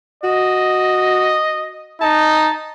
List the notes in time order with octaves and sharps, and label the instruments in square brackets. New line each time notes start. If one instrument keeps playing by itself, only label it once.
[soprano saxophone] F#4 [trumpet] D#5
[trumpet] D#4 [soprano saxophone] A5